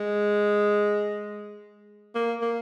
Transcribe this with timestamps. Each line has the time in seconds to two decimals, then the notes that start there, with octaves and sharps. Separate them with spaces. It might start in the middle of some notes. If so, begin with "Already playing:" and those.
Already playing: G#3
2.15 A#3
2.41 A#3